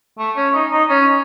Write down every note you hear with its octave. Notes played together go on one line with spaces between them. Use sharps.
A3
C#4
D#4
D#4
C#4